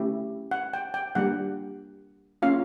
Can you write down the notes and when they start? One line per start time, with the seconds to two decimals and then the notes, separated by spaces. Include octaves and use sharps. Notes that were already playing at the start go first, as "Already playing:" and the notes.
Already playing: A3 C#4 E4 G4
0.51 F#5
0.73 G5
0.94 G5
1.15 G3 A#3 D4 G4 F#5
2.42 A#3 C#4 F4 F5